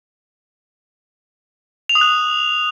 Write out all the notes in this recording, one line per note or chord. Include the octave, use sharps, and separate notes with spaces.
F7
D#6
F#6